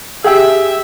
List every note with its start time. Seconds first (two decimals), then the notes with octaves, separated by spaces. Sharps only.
0.24 G4 G#4 E5